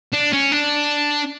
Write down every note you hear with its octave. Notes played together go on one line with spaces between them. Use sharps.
D4
C#4
D4